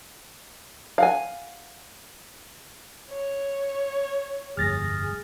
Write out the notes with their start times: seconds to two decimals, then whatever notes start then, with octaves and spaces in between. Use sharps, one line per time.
0.98 F5 F#5 G#5
3.10 C#5
4.57 F1 D2 G2 G#4 F6 A6 A#6